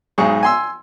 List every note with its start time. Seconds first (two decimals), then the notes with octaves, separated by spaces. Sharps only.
0.18 B1 G#2 G#4 C#6
0.43 G#5 C6 E6